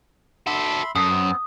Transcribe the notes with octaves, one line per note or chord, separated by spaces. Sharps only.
F#4 A4 E5 B5 C6
F#2 A4 D#6
B3 C4